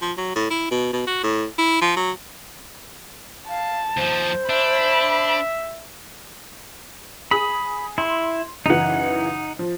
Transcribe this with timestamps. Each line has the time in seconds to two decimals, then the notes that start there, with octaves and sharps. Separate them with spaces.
0.02 F3
0.17 F#3
0.36 A2
0.51 E4
0.71 B2
0.93 B2
1.07 F#4
1.24 A2
1.58 E4
1.82 F3
1.96 F#3
3.49 F5 A5
3.97 D#2 F3 C5
4.49 D4 E5 B5
7.31 G#4 B5 D#6
7.98 E4 C6
8.66 F#2 C#3 E3 D#4 F#5
9.59 F3